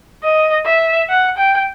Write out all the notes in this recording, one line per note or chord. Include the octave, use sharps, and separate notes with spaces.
D#5
E5
F#5
G5